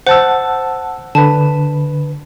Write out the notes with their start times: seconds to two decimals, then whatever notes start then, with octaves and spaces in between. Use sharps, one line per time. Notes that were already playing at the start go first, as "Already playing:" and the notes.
0.07 C5 F#5 A5 E6
1.15 D3 B4 A5